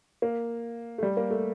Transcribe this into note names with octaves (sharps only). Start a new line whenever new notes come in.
A#3
A3
G3
A#3
A3